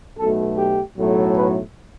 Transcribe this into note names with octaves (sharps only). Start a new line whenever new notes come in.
B1 B2 A3 A4
G4
B1 A2 F#3 A3
B4